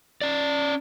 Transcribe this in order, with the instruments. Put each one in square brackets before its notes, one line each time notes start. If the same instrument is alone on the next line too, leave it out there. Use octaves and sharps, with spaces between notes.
[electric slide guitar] C#4 D5